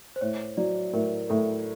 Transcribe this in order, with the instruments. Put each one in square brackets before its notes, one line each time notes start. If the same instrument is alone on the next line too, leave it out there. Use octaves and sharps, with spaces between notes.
[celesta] C5
[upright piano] A2 [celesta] C#5
[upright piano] F#3 [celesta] D5
[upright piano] A2 [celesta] A#4
[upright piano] A2 [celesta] A4